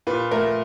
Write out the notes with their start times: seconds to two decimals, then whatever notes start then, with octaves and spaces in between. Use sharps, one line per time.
0.07 A#2 B4
0.31 A3 A#4